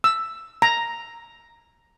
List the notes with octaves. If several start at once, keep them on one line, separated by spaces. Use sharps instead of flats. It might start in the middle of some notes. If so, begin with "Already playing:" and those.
E6
A#5